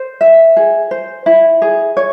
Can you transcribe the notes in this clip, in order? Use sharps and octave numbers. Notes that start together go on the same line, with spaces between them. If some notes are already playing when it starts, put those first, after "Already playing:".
Already playing: C5
E5
G#4
C5
E4
G#4
C#5